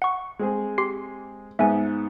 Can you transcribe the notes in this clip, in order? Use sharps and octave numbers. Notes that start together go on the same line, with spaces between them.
F#5 C#6
G#3 C4 G#4
G4 C6 C7
G#2 B3 E5 G#5